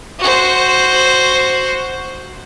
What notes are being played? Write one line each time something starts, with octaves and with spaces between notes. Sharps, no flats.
F#4 C5